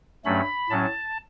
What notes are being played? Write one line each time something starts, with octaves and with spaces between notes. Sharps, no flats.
G2 F#3 A3 C#4 B5
A2 F#3 C#4 A5